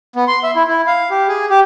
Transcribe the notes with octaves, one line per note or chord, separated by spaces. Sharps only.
B3
C6
E5
E4
E4
F5
G4
G#4
G4